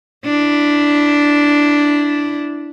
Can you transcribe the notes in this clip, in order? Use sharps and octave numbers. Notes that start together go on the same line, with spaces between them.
D4 E4